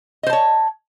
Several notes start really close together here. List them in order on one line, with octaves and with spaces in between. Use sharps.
D#5 C5 A5 C#5